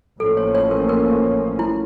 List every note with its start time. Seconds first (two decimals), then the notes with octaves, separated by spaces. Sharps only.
0.20 A1 A2 F3 A#3 C#4 A4
0.37 C#5
0.55 C#5
0.71 A#4
0.89 A#4
1.59 E4